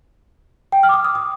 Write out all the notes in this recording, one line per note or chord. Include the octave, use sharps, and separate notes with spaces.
G5
F6
D6
D#6
D#6
D#6